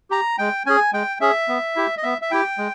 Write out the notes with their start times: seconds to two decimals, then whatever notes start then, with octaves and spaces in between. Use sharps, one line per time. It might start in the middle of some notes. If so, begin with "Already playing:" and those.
0.11 G4 A#5
0.38 G#3 G5
0.66 C#4 G#4 G#5
0.93 G#3 G5
1.21 C#4 G#4 E5
1.48 B3
1.76 E4 G4
1.97 D#5
2.03 B3 E5
2.22 E5
2.31 E4 G4 G5
2.58 G#3